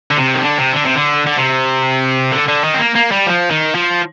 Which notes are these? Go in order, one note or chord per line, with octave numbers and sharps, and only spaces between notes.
D3
C3
D#3
D3
C3
D3
C3
D3
D3
C3
D3
D3
D#3
C4
A#3
A#3
G3
F3
D#3
F3